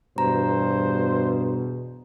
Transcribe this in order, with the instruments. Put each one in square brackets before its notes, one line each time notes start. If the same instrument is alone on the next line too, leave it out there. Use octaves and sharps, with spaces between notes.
[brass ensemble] E2 B2 [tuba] G2 [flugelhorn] C5 [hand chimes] A#5